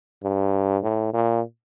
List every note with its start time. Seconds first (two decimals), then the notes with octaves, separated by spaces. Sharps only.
0.23 G2
0.83 A2
1.13 A#2